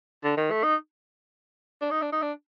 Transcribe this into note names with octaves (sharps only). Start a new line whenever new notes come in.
D3
D#3
A3
D#4
D4
D#4
D4
D#4
D4